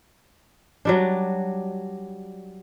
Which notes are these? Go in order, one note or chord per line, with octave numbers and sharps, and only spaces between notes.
F#3 G3 D4